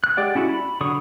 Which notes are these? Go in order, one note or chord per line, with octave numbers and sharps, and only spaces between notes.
F#6
G#3 G4 D5 F#5
C#4 E4 F#4
B5
D3 F#3 C#6 D#6